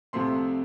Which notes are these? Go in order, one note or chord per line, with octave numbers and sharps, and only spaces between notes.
C2 C3 F3 A3 C4 C6